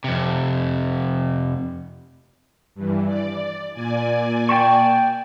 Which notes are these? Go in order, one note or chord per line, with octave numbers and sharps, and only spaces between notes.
F2 C3
G2 E3
D5
A#2 D5 G#5
G5 A5 C#6